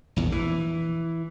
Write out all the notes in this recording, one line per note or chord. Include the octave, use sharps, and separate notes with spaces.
A#1 E2
E3